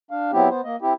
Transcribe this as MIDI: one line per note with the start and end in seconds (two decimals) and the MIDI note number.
0.11 0.31 62
0.11 0.31 77
0.33 0.49 54
0.33 0.49 59
0.33 0.49 60
0.33 0.49 64
0.33 0.49 67
0.49 0.61 59
0.49 0.61 72
0.64 0.76 58
0.64 0.76 75
0.82 0.93 60
0.82 0.93 64
0.82 0.93 67